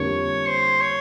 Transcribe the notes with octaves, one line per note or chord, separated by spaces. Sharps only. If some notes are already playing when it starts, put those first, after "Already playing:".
Already playing: F2 D3 G3 A#3 C#5
C5
C#5